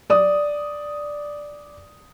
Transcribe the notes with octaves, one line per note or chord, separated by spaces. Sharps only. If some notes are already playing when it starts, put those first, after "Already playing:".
D5 D#6